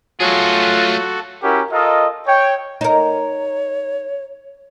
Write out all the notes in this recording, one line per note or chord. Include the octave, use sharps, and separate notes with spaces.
F#3 A3 F4 F#4 G#4 A4
C#4 E4 F#4 G4 A#4
F4 A4 A#4 D#5
C#5 G5
D#4 A#4 C#5